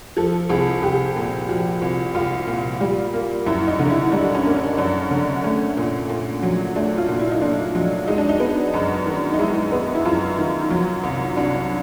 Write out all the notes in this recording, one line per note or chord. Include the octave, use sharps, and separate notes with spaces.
F3 A4
C2 G#4
C2 G4
A#2
F3 F#4
C2
C2 F4
A#2
G3
A#3
F#2 E4
D#4
D3
E4
G3 D4
C#4
A#3
D4
F#2 D4
D3
A3 C#4
A#2
A#2
F#3
A3 D4
F4
A#2
E4
D#4
A#2 D4
F#3
G#3 D#4
D4
D#4
B3
F#2
D#3
D#4
G#3 E4
B3
E4
F#2 F4
D#3
F#3
C2
C2 D4